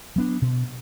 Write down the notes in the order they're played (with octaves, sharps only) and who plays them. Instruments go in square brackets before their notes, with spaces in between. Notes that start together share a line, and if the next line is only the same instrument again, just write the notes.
[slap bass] F#3 B3 D4
B2